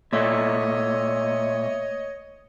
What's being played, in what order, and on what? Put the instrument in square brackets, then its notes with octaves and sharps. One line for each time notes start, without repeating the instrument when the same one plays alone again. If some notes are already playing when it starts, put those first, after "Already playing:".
[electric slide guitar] A#2 A3 [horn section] C#5 D#5